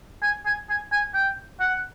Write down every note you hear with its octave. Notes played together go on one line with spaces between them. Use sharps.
G#5
G#5
G#5
G#5
G5
F#5